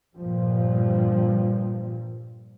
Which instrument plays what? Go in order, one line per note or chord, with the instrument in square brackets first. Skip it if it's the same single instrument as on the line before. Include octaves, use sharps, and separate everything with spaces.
[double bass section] G2 A#2 F3 G3